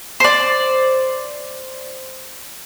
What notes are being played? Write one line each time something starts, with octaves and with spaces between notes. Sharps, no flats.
C5 D5